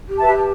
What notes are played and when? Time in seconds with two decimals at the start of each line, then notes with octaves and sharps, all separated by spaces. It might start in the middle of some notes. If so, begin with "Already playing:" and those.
0.09 G4
0.18 B4 E5 A5
0.27 G4